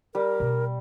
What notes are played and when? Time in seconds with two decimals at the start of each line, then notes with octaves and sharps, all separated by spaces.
0.15 G3 A#4
0.40 B2